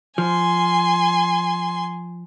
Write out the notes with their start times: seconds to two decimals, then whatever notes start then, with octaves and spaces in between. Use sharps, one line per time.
0.18 F3 G#5 C6